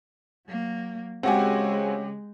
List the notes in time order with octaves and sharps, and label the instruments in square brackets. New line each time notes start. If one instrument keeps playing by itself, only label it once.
[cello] F#3 A#3
[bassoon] C#3 [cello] G#3 [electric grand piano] C4 F#4 G#5 [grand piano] G4 F#5